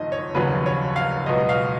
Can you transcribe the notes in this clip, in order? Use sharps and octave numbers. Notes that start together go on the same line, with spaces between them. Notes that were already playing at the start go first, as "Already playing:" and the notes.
Already playing: F#1 F2 D#3 D#5
C#5
F1 D#2 C#3 F#3 C#4 B4
C#5
F5
C#2 B2 F#3 D#5
F5